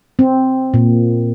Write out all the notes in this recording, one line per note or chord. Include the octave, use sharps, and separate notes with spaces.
C4
A#2